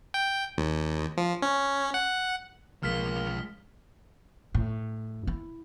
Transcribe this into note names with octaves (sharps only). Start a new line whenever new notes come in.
G5
D#2
F3
C#4
F#5
B1 F3 G#3 A#3 F4 F6 B6
A2
E4